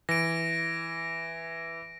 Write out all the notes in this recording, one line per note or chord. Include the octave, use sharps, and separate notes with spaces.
E3 A#6 D7